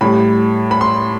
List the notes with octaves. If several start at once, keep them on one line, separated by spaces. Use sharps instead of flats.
A2 G3 B5
B5
C6